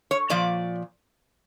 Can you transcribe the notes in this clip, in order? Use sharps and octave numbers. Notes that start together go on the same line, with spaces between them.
C#5
A#2 F3 D5